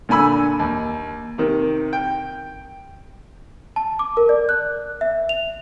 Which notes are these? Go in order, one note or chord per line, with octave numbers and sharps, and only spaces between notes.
A#2 D3 G#5 B5 E6
D#2
C3 D#3
G5
A5
D6
A#4
D5
F#6
E5
F7